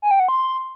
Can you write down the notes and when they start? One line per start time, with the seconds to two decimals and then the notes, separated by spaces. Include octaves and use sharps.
0.02 G#5
0.11 G5
0.20 F#5
0.28 C6